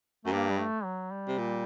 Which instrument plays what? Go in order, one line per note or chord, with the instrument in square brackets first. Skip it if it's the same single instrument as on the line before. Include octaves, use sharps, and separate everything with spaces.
[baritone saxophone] F#2 [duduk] A3
[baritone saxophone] G2 [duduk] A#3
[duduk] G3
A3
F#3
G3
[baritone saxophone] C3
A#2